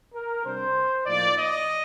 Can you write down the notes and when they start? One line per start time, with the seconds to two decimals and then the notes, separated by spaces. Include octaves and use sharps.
0.14 A#4
0.44 C3 G3 D4 C5
1.06 A2 F3 A#3 D#4 D5
1.37 D#5